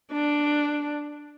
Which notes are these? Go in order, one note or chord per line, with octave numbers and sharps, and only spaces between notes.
D4